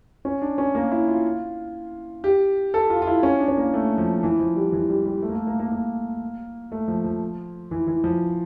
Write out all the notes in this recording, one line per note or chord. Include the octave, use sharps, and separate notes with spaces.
C#4
D4
C#4
A#3
E4
F4
G4
A4
F4
F4
E4
C#4
D4
C#4
A#3
A3
F3
E3
F3
G3
E3
G3
G3
A3
A#3
A3
A#3
A#3
A#3
A3
F3
F3
E3
E3
F3